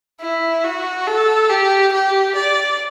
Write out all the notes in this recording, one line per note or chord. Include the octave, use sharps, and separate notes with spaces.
E4
F#4
A4
G4
G4
D5